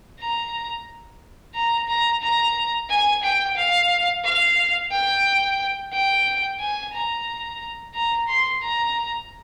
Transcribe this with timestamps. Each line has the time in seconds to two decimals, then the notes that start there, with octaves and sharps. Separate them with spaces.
0.20 A#5
1.54 A#5
1.88 A#5
2.22 A#5
2.90 G#5
3.23 G5
3.57 F5
4.24 F5
4.92 G5
5.92 G5
6.60 G#5
6.94 A#5
7.95 A#5
8.28 C6
8.62 A#5